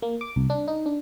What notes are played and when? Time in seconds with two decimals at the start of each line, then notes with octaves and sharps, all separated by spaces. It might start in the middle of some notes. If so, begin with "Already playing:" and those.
0.02 A#3
0.21 D6
0.36 C2
0.50 D4
0.68 D#4
0.86 D4